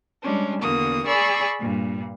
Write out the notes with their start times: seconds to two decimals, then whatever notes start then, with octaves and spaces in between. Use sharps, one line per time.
0.22 G3 G#3 C#4 D4
0.61 E2 D3 A#3 F#4 D#6
1.06 G#4 D5 B5 C#6 E6
1.59 G2 A#2